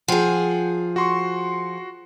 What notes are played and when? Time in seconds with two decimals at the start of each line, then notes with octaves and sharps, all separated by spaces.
0.08 F3 G#4 F#5 G5
0.96 F#4 C6 C#6